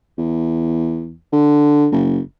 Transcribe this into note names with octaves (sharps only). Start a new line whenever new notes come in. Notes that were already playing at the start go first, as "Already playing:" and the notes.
E2
D3
F#1